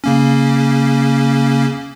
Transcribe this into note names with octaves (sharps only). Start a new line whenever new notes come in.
C#3 A#3 C#4